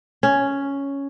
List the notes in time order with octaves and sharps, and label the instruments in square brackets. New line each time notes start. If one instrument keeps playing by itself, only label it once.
[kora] C#4